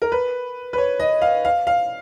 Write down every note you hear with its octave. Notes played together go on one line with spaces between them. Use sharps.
A#4
B4
B4
C#5
D#5
F5
F5
F5